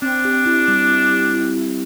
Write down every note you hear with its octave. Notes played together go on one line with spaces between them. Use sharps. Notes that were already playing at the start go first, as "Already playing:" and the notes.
C4 D4
G4
E4
G3
E4
G4
E4
E4